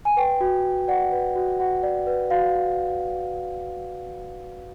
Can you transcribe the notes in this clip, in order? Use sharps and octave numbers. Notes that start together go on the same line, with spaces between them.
G#5
B4 G5
F#4
F#4
D5 F#5
B4
F#4
F#4 F#5
D5
B4
F#4 F5